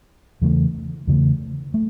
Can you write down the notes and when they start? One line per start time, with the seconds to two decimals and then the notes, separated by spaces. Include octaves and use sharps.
0.42 E2 C#3 E3 A3
1.07 E2 C#3 E3 A3
1.74 A3